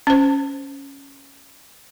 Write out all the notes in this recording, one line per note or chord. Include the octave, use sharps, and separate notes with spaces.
C#4 C5